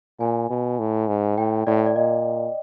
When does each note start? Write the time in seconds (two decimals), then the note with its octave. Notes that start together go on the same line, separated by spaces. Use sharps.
0.20 A#2 G#5
0.50 B2
0.79 A2
1.08 G#2
1.38 A2 G5
1.67 A2 D5
1.86 D5
1.96 A#2 D#5